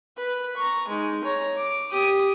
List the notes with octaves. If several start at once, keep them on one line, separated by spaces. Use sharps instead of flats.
B4
A#5 C#6
G#3 D#4
C#5 A#5
D6
G4 D#6